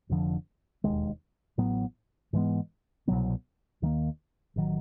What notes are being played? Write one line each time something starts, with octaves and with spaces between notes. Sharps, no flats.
F1 F2 D3 F3
E1 D#2 D#3 G#3
A1 A2 F#3 B3
G#2 E3 G#3 B3
C2 B2 F#3 B3
D#2 D#3 F#3 A#3
A1 D#3 F#3